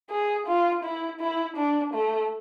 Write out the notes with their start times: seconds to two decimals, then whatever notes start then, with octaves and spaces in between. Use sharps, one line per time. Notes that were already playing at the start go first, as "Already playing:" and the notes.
0.11 G#4
0.47 F4
0.84 E4
1.20 E4
1.57 D4
1.94 A3